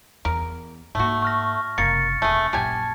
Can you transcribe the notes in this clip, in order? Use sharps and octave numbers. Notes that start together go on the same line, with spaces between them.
E2 A#4
G#2 A3 A#3 F#4
C#6 F6 A#6
F#1 C3 A#3 A6 C#7
E1 A3 G#4
A#1 F#2 G4 G#5 A5 G#6